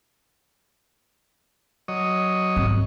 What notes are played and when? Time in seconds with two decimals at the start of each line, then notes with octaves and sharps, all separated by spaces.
1.88 F#3 C#5 D#5
2.57 G#1